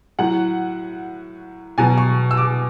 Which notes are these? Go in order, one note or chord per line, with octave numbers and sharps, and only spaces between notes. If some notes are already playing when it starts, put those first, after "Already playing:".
A2 F#3 F#5
B2 F#3 G#5
C#6
E6
D6